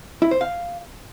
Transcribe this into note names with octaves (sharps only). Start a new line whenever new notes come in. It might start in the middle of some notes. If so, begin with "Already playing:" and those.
E4
C5
F5